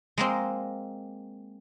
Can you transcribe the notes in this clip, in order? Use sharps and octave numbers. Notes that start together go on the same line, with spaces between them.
G#3 A#3 C4